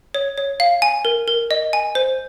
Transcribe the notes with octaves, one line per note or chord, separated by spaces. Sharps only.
C#5
C#5
F5
G#5
A#4
A#4
D#5
G#5
C5